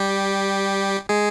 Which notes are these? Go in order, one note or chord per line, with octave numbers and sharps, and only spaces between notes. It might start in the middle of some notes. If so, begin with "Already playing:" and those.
Already playing: G3 G4
G#3 G#4